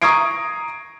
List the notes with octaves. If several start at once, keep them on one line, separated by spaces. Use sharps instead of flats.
A#5 C#6 D#6 G#6 C7 D7